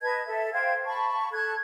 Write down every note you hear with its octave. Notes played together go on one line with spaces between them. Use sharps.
B4 D#5 A5 G#6
A4 E5
C5 F5 G5 G#6
A5 B5 C#6
A4 F#6 G#6